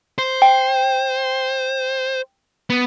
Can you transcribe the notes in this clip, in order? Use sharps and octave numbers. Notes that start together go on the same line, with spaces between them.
C5
G5
B3